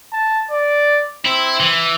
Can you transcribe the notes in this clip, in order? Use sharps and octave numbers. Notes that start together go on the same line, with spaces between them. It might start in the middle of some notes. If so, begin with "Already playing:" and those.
A5
D5
C4 E4
E3